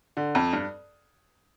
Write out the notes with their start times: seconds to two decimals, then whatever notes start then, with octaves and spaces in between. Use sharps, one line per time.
0.17 D3
0.35 F2
0.53 G2